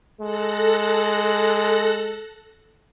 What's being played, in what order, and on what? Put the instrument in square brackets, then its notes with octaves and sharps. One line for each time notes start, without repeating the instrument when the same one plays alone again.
[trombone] G#3 [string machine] A4 F#6 A#6